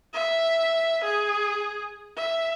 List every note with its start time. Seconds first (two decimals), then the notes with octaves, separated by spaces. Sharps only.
0.13 E5
1.04 G#4
2.16 E5